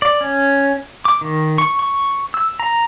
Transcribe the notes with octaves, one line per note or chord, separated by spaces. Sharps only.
D5
C#4
D6
D#3
C#6
C#6
E6
A#5